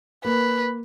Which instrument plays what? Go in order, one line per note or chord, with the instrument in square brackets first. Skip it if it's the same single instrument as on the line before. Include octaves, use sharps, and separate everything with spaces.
[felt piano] A#3 [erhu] B4